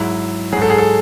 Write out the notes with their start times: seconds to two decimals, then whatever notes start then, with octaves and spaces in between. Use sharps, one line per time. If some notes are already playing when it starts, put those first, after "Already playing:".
Already playing: G#2 F#3 E4
0.53 G#2 F#3 G#4
0.62 A4
0.70 G#4
0.78 A4